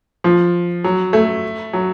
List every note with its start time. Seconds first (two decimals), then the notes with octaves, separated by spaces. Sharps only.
0.24 F3
0.84 F#3
1.13 A3
1.73 F#3